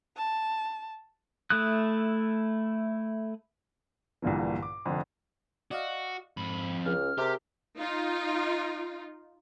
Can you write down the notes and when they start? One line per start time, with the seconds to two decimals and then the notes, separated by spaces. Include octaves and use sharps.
0.17 A5
1.50 A3 E4 D#6 F#6
4.22 A#1 G2 A#2 D3 E3
4.62 D6
4.85 F1 F2 D3 D4
5.71 F#4 D5 D#5 F5
6.37 F2 G#2 B5
6.86 C#2 C#4 F6
7.18 C3 G4 G#4 A#4
7.75 D#4 F4